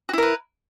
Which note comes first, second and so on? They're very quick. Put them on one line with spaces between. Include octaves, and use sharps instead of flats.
F#4 E4 A#4 B4